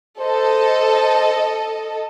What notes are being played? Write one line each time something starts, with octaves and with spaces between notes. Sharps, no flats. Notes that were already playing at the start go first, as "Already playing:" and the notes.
A4 C5 D#5